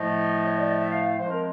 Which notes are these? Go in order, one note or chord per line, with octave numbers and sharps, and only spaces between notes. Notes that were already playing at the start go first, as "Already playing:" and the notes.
Already playing: A2 F3 A3 D#5
C#5
D5
D#5
E5
F5
F5
F3 G#3 C4 C5
A#4